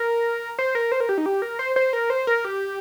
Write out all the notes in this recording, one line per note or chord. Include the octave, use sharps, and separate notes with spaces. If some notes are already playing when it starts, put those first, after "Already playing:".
Already playing: A#4
C5
A#4
C5
A#4
G4
D#4
G4
A#4
C5
C5
A#4
C5
A#4
G4